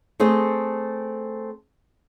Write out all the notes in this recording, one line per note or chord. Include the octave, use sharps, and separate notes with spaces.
A3 C4 G#4 A4 D#5